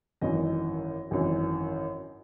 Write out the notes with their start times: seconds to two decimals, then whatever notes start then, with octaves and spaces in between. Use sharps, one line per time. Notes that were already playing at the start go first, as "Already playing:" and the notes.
0.21 G#1 F#2 E3 D#5
1.11 G#1 F#2 E3